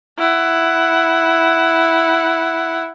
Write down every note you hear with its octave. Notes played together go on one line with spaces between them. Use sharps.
E4 F#5